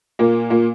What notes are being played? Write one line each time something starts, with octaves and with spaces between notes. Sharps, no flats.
A#2 A#3
A#2 A#3